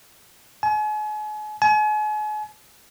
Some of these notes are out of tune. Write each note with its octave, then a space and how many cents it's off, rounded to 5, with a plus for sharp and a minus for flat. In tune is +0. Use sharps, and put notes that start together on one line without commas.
G#5 +40
G#5 +40